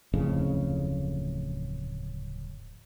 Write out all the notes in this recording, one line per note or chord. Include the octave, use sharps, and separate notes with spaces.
D1 F2 A2 C#3